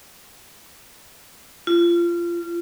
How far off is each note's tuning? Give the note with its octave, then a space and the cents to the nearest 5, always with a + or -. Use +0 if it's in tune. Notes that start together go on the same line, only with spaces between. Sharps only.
F4 -25